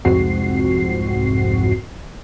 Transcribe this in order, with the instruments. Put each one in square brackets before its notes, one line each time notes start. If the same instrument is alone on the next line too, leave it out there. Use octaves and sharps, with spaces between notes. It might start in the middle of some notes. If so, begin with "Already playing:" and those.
[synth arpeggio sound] C2 F2 G#2 C4 F#4 C7